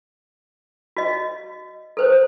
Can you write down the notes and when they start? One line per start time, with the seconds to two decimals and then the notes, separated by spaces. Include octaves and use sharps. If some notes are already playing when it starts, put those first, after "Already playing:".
0.97 F#4 D#5
1.97 A4 B4 C5